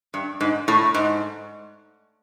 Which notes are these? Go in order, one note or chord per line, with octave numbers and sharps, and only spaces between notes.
G2
G#2
A2
G#2